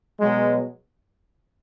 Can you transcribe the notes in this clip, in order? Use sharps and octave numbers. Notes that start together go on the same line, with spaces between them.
B2 F#3 G#3